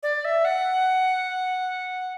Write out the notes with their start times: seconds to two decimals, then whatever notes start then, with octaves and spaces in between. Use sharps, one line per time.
0.03 D5
0.25 E5
0.45 F#5